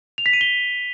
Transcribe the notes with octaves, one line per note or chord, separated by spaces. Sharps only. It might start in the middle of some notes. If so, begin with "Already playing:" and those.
F7
B6
D#7
G7